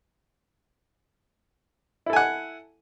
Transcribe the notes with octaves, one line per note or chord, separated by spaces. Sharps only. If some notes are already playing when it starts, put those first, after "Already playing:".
E4 A4 F#5 G#5